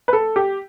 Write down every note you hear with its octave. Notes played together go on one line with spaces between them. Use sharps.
B4
A4
G4